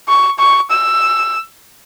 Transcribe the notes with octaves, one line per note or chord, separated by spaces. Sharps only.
C#6
C#6
E6